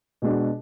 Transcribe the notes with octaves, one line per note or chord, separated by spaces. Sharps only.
B2 G#3 D4 F#4